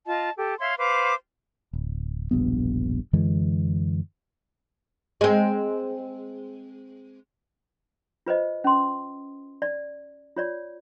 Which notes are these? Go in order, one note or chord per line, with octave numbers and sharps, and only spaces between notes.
F4 D#5 A5
G4 A4
C#5 E5 F5 C6
B4 C5 F5 D6
D1
E1 A#1 G2 B3
F#2 D3 E3 G#3
G#3 C4
F4 B4 C5 D#5
C#4 C6
D5
F4 C#5 D5